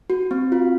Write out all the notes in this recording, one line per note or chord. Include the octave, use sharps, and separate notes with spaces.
F#4
C4
F4